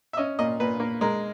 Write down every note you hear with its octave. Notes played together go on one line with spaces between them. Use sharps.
E5
C#4 D#5
A#2 D#5
A#2 B4
A#3
G#3 A#4